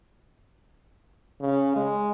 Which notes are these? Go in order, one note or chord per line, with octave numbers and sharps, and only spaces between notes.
C#3
G#3